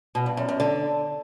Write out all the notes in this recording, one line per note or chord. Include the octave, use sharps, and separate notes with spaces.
B2
G2
F#2
F#2
D3